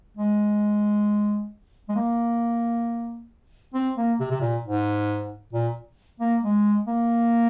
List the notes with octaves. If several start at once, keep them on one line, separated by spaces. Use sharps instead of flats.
G#3
G#3
A#3
C4
A#3
C3
C3
A#2
G#2
A#2
A#3
G#3
A#3